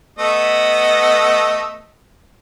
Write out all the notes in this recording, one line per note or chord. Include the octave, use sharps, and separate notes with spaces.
A3 B3 D#5